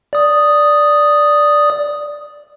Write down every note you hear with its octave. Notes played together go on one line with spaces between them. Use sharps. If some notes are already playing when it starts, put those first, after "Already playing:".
D5 D#6